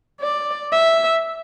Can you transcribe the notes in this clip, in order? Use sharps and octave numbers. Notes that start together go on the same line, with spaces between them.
D5
E5